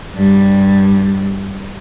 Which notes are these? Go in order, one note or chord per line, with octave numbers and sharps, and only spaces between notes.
G2 G3